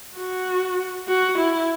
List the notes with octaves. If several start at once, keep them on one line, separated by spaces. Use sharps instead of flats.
F#4
F#4
E4